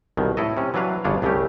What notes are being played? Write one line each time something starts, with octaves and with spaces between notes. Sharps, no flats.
C2 B2 D#3
A2 E4 A4 D#5
C3 C#4
E3 F#3 D4 B4 F5
G1 C#3 D4 F4 C#5
C2 C#3 A3 C#4 G4